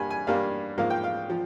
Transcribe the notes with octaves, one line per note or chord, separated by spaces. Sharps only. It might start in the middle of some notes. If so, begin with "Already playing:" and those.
Already playing: G2 G3 A#3 G#5
G#5
G2 G3 A#3 F5
G#2 F3 A#3 F5
G5
F5
F3